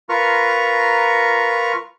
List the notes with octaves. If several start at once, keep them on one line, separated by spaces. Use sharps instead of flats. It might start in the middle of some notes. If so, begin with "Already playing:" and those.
F4 A#4 B4 A#5 C#6 F6